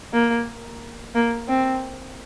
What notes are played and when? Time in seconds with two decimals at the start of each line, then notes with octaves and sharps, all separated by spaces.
0.13 A#3
1.15 A#3
1.48 C4